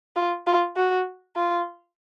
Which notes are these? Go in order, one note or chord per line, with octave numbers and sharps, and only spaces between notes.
F4
F4
F#4
F4